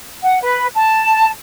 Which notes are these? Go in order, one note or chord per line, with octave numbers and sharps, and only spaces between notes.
F#5
B4
A5